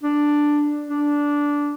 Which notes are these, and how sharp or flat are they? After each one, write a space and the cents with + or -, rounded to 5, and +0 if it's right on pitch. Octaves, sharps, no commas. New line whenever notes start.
D4 +5
D4 -10